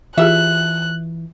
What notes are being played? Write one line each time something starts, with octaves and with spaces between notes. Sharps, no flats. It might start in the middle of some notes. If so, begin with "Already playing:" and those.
E3 F4 G4 G#4 E5 F#6